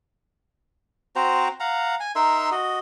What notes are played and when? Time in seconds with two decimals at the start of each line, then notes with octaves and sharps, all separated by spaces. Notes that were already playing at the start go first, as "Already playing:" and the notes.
1.16 C4 F#4 C5 A#5
1.60 F5 F#5 A#5
2.00 G#5
2.15 D#4 A#4 E5 C6
2.51 F#4 D#5